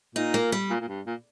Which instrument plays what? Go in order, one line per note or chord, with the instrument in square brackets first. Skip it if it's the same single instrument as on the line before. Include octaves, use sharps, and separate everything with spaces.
[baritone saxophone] A#2 [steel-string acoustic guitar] D#4
[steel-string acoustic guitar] A#3
G3
[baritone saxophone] A#2
A#2
G2
A#2